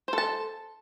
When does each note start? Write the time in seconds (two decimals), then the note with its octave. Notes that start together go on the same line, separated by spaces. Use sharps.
0.08 C5
0.13 A4
0.18 A5